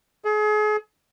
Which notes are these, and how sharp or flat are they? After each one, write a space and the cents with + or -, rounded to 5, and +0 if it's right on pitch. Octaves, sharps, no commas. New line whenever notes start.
G#4 +35